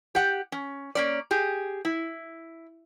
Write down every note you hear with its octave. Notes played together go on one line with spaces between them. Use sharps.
G4 F#5
C#4
A#3 C#4 D5
G4 G#4
E4